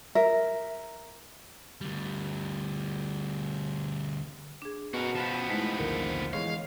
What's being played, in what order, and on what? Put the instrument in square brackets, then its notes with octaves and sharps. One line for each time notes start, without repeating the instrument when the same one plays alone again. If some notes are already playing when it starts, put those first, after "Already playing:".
[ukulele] A#4 E5
[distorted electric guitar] D2 G3
[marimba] D4 G#4
[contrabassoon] B2 [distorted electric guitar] F#4 A#4
[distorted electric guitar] F3 B3 [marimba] F#4 [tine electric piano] A5 B5
[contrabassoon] G#2 [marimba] G#3 A3 E4
[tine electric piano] A#1 D#2 D3 [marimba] A#4
[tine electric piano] E3 G#3 C#5 [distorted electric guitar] F5